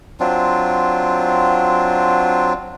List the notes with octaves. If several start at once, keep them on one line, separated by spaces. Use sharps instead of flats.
F#3 C4 D4 F4